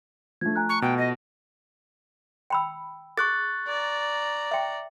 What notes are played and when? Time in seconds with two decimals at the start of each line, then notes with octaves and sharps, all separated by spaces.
0.41 F3 A3 D4 G#6
0.56 G#5 A#5 F#6
0.69 C#6
0.82 B2 G5
0.98 D#5 A#6
2.50 G5 B5 E6
3.17 G#4 C#6 F#6 A6
3.68 D5 A#5
4.51 E5 G5